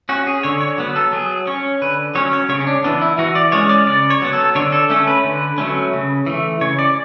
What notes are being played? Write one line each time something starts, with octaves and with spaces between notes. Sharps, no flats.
C#4 F#4
G#4
D3 C#5
C#5
F#3 B3
A4
F#3 G#4
C#4 C#5
D3 B4
F#3 C#4 C#5
C#5
C#3 C#5
C#4
D4
E3 B3 D4
E4
E3 F#4
D5
G#3 C#4 C#5
D5
C#3 D5
C#5
F#3 B3
A4
D3 C#5
A4
A3 C#4 A4
B4
D3
F#3 A3 C#4
C#3
E3 A3
C#3 C#5
D5